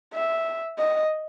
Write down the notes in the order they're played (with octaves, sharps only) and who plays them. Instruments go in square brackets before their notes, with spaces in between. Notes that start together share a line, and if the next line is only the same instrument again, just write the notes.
[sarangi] E5
D#5